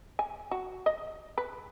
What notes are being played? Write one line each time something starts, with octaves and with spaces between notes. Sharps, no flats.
G#5
F#4
D#5
B4